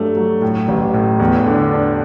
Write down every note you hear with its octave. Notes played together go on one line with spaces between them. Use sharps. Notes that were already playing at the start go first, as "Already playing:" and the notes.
Already playing: G2 F#3 A3
F#3
A2
A1
A2
E2
D3
D4